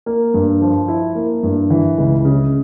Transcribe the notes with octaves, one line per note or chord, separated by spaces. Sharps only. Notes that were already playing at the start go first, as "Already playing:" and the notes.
A#3
G2
F3
E4
A#3
G2
E3
C#2
C#3